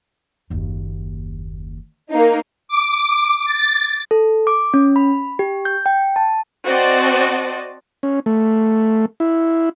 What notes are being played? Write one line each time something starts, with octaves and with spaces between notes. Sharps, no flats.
F#1 D#2
A#3 D#4
D6
A6
A4
D6
C#4
B5
G4
G6
G5
A5
C4 F#4 C5 D5 D#5 A5
C#4
A3
E4